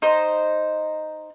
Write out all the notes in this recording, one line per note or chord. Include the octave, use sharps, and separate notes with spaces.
D#4 C5